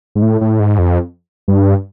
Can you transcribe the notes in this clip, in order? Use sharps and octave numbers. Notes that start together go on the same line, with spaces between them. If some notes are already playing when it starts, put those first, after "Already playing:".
G#2
A2
A2
G#2
F2
G2